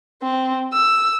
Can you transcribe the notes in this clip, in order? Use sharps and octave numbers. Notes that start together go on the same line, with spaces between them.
C4
E6